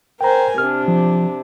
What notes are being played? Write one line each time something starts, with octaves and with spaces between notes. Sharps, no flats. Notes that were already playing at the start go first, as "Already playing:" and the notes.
A#4 C5 G5 G#5 A#5
C3 D4 F6
F3